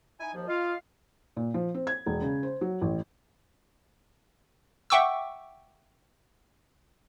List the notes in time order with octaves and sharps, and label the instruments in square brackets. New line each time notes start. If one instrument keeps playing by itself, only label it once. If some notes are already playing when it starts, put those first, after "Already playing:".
[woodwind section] D#4 E4 G#5
D#2 F3
[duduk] F4 [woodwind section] D#5 F5
[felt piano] A#2
F3
C4
G#6
E1
C#3
C5
F#3
A1
[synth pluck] E5 F#5 G5 C#6 D6 E6